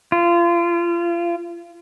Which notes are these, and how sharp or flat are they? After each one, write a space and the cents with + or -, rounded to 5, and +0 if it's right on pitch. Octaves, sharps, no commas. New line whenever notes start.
F4 -30